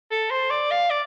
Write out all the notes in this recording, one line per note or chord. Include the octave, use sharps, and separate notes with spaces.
A4
C5
D5
F5
D5